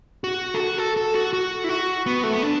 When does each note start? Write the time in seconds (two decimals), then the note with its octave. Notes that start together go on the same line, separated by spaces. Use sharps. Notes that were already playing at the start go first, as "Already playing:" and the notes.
0.24 F#4
0.54 A4
0.60 F#4
0.78 A4
0.97 A4
1.15 F#4
1.33 F#4
1.64 E4
1.69 F#4
2.06 B3
2.23 A3
2.33 B3
2.42 D4